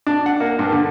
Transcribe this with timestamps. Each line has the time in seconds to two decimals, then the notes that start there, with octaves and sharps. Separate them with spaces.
0.06 D4
0.26 F#5
0.40 A#3
0.59 G2
0.72 D3